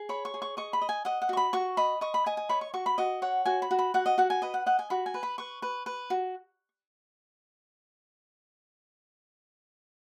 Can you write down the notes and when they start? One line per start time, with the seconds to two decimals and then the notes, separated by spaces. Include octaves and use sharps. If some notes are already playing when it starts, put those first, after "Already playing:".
Already playing: G#4
0.09 C#5 B5
0.25 C#6
0.34 G#4
0.42 C#6
0.57 D#5 C#6
0.73 B5
0.81 D#5
0.89 G#5
1.05 D#5 F#5
1.22 F#5
1.29 F#4 C#6
1.37 B5
1.53 F#4 C#6
1.77 D#5 B5
2.01 D#5 C#6
2.14 B5
2.26 D#5 G#5
2.37 G#5
2.49 C#5 B5
2.61 C#6
2.74 F#4 C#6
2.86 B5
2.98 F#4 D#5
3.22 C#5 F#5
3.45 F#4 G#5
3.62 B5
3.71 F#4
3.79 B5
3.94 F#4 F#5
4.06 D#5
4.18 F#4 F#5
4.30 G#5
4.42 B4 D#5
4.54 F#5
4.66 D#5 F#5
4.79 G#5
4.90 F#4 B5
5.06 G#5
5.14 B4
5.23 B5
5.38 B4 C#6
5.62 B4
5.86 B4
6.10 F#4